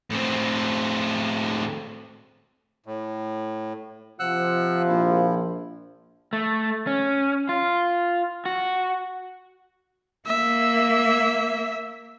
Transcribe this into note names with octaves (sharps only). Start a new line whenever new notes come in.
A2 C4
A2
C3 F3 F#5 E6 F#6
A#1 E4
A3
C#4
F4
F#4
A#3 E5